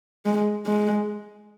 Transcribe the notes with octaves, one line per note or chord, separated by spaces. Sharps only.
G#3
G#3